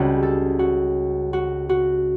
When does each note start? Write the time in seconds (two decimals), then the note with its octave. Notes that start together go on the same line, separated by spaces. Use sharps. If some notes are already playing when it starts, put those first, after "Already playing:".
Already playing: C#2 C#3 G3 C#4 F#4
0.23 A4
0.59 F#4
1.33 F#4
1.69 F#4